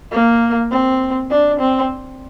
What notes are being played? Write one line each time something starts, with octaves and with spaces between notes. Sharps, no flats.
A#3
C4
D4
C4